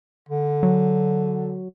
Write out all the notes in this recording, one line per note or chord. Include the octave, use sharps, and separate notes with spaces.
D3
F#3